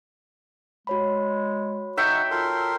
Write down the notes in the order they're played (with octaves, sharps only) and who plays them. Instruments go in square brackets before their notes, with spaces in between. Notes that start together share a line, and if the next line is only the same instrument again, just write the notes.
[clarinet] G#3 [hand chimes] F#4 C#5 B5
[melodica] D#4 F#5 [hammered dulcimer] E5 G5 [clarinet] C#6
[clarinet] F4 [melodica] A4 A#4 C6